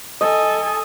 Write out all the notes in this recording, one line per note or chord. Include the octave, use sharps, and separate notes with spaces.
A4 D#5 G#5